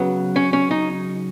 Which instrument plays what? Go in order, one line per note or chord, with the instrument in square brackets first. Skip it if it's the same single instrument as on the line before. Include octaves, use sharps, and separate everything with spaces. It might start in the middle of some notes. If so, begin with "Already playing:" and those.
Already playing: [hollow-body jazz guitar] C#3 F#3 B3
C#4
C#4
D#4